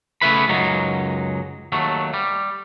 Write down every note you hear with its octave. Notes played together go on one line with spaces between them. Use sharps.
C#3 A3 B3 E4 B4 B5
C#2 F#2 F#3 D#4
D#2 F#3 A3
G3